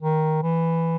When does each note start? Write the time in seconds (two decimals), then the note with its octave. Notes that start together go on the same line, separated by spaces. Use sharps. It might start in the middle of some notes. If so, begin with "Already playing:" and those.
0.02 D#3
0.42 E3